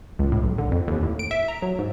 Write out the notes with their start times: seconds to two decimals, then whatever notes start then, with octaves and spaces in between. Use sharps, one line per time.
0.19 C#2
0.32 A2
0.43 B1
0.58 D3
0.72 F2
0.88 D#2
1.03 A2
1.19 D7
1.31 E5
1.48 A#5
1.62 F#3
1.79 G#2